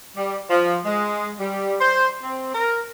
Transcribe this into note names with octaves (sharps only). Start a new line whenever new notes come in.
G3
F3
G#3
G3
C5
C4
A#4